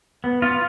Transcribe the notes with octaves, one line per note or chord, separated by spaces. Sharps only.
B3
B3 F4